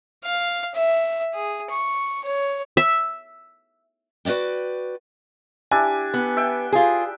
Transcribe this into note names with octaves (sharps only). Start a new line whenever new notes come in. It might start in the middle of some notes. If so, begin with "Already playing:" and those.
F5
E5
G#4
C#6
C#5
E5
F#4 B4 C#5 D5 G5
D4 E4 G4 G#5
B3
E5 G5
F4 G#4